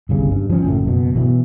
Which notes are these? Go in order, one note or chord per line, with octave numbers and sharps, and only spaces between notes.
G1 C2 C#3
G2
F3 C#4
F#1 F#2 A2
F#1 B2
B2 E3 F#3